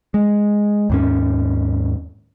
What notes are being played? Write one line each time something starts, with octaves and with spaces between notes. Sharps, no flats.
G#3
D#2 G#2 C#4